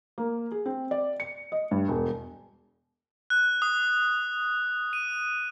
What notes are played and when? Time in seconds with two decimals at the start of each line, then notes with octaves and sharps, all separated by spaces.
0.18 A#3
0.51 G#4
0.66 C4
0.91 D5
1.20 C#7
1.52 D#5
1.71 G2
1.88 E1
3.30 F#6
3.62 D#6
4.93 D#7